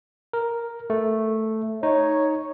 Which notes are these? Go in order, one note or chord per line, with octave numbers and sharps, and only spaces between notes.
A#4
A3
D#4 C#5